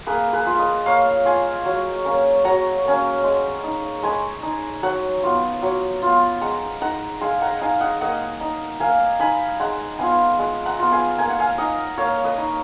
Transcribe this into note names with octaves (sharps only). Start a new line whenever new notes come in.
A#3 G#4 B4
G#4 B4
F4
B4 D#5
A#3 C#5 F5
F4 F5 G#5
F#3
A#3 C#4
F#3 F#5 A#5
A#3 C#4
G#3
D#4
G#3 G#5 B5
D#4
F#3 F#5 A#5
B3 F4
F#3
B3 F4
G#3 F#5 A#5
D#4 F#5 A#5
G#3 F5 G#5
F#5 A#5
D#4 F5 G#5
D#5 F#5
A#3 D#5 F#5
D#4
A#3 F5 G#5
D#4 G#5 B5
G#3 F#5 A#5
B3 F4 F5 G#5
G#3
F#5 A#5
B3 F4
F5 G#5
A#3 G#5
F#5
F5 G#5
D#4 D#5 F#5
A#3 C#5 F5
B4 D#5
D#4